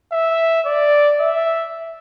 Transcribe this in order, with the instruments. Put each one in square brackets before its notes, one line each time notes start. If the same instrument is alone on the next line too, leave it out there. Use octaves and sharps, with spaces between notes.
[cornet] E5
D5
E5